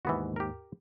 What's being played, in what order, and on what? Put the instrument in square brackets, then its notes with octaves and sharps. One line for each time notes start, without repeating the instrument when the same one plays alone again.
[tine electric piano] D#2 G#2 [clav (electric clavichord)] E3 B3 F#4
[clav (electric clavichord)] G4 A#4